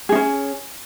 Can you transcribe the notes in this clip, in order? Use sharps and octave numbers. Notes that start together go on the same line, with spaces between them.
C#4 D#4 G#4